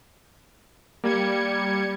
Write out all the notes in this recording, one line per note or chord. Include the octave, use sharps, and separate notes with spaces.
G3 A#3 G#6 C#7